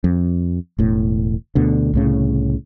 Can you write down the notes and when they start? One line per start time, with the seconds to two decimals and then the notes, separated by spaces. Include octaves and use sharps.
0.04 F2
0.78 E1 A2
1.55 D2 B2 D3
1.93 C2 A2 C#3